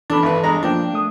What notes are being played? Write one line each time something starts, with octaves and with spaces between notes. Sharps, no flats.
E3 D4 A4 B5
G#1 B4
G2 G#3 A#5
F3 A#3 D4 G5
A3 D#6